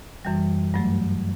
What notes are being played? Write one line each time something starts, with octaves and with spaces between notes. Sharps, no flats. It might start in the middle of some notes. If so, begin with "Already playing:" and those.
F#2 E3 G3
G2 F#3 A3